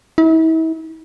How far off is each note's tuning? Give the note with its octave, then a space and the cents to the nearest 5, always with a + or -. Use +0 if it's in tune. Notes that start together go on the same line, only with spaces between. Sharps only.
E4 -40